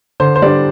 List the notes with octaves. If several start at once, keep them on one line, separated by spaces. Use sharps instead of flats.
D3 C5
C5
G3 D4 D5